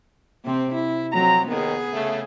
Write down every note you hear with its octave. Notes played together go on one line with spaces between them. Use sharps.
C3 C4
E4
F2 F#3 C4 A#5
D#2 A#2 D#3 B3 G#4
C#3 A3